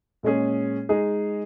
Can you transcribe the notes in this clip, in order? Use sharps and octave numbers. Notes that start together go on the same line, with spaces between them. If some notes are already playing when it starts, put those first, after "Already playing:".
A#2 G#3 C#4 G#4
G#3 D#4 G#4